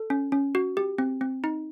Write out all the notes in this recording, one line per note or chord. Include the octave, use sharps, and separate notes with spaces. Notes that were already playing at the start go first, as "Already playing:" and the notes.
Already playing: A4
C#4
C#4
F#4
G4
C4
C4
D#4